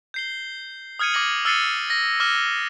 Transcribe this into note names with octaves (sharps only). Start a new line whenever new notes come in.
G6 C7 G7
D#6 F6 G#6 C#7 D#7
D6 G#6 A#6 F#7
E6 F6 A6 C7 C#7 D#7
A#6
D6 F6 A#6 E7 G7